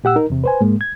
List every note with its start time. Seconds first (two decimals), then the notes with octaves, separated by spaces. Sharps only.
0.04 A#2 G4 F#5 E6
0.16 D#4 A#4
0.30 E2 C3
0.44 B4 C5 G#5
0.61 G#2 G#3 A#3
0.81 G#6